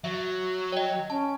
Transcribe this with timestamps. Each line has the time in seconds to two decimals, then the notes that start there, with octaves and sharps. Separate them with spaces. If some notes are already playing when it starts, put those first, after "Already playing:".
0.04 F#3 E5
0.72 C#5 D#5 G5
1.10 C#4 A5